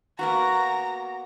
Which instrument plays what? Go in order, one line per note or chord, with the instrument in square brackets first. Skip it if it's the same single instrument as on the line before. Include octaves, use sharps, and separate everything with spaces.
[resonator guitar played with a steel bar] A#3 B3 F#4 [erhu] A#5